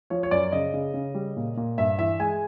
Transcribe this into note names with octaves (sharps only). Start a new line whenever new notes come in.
F3 C#5
C#5
F#2 D5
C#3 D#5
C#3
C#3
G3
A#2
A#2
G2 E5
E3 E5
G#3 G#5